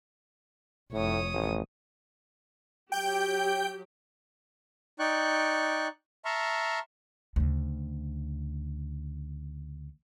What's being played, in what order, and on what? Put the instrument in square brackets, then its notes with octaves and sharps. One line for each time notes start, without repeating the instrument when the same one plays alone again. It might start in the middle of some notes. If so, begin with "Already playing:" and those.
[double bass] F1 [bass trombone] A2 [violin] C#5 D#6
[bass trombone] A1
[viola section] F#3 G4 [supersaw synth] G5 G6
[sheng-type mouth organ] D#4 D5 G5 C#6 F#6
E5 A5 A#5 C6 C#6 F6
[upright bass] D2 C#3